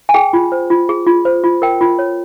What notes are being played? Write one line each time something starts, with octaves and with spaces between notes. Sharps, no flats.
G#5
G#4 G5
F4
C5
F4
G#4
F4
C5
F4
A#4 G5
F4
C#5